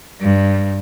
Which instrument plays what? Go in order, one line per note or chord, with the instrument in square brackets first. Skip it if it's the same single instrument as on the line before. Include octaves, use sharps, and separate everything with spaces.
[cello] G2